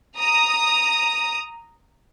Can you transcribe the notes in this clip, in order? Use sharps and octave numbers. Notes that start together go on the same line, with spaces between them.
A#5 D#6